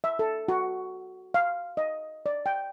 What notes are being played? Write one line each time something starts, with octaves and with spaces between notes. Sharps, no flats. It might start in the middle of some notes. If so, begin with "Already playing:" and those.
E5
A4
F#4
F5
D#5
D5
G5